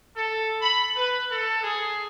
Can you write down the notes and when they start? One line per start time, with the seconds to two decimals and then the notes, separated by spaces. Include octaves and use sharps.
0.16 A4
0.61 B5
0.97 B4
1.31 A4
1.63 G#4